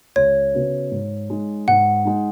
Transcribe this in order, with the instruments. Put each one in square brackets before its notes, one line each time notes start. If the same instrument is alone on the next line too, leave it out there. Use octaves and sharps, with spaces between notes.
[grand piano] C#2 [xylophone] C#5
[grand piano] C#3 B3 F#4 B4
G#2
G#3 D#4
[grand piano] G#2 [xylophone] F#5
[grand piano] G#3 D#4